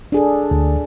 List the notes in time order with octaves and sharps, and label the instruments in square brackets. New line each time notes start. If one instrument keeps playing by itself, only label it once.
[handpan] D4 G#4 A4
[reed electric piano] D2